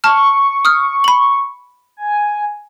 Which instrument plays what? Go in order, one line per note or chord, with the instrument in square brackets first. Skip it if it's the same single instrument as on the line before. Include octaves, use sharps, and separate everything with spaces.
[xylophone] A5 F6 [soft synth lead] C#6
[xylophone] D#6 F6
B5 F#7
[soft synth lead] G#5